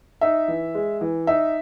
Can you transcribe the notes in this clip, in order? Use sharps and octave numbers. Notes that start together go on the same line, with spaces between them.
D#4 E5
E3
G#3
E3
D#4 E5